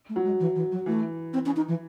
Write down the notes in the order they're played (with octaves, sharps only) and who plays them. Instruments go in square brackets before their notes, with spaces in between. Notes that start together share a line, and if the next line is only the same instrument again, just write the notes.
[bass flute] A3
[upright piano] F#3
[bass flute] G#3
E3
E3
F#3
[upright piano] E3 [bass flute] A3
[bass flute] C4
C#4
D#4
E3